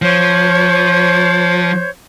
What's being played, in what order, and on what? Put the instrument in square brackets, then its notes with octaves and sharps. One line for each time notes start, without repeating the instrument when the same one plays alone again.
[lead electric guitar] F3 [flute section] C5 C#5 G6